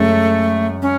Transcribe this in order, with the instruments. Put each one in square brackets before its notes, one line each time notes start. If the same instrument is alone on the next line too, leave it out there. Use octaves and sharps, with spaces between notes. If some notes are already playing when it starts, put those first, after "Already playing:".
Already playing: [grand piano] F#2 C#3 G#3 [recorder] A3
[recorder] C#4